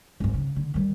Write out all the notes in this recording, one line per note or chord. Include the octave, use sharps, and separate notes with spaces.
G#1 G#2
C#3
D3
D#3 G3